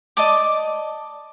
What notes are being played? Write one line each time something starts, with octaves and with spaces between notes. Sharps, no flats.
D5 D#5 A5 D6